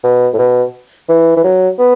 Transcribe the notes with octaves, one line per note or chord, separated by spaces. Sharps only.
B2
A2
B2
E3
E3
F#3
B3